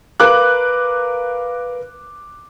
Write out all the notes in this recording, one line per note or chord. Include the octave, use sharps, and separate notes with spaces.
A#4 B4 F5 D6 F#6